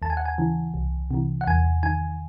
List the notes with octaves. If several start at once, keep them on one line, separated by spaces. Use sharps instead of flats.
D#2 A5
G#5
F#5
G#5
C#3 E3
C2
C3 E3
F#5
E2 G#5
D#3 G#5